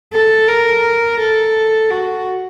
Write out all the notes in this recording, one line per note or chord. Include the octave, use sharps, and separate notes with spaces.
A4
A#4
A4
F#4